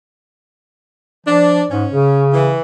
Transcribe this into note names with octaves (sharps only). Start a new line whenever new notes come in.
F3 D4
G#2 C#4
C#3
E3